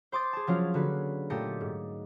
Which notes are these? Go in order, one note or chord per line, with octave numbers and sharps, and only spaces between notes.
C5 C6 D6 D#6 A6
G#4 A5
F3 F#3 C#4 F4
D3 A#3 F#4 B4
A#2 A3 G4 D#5 A5 C#7
G#2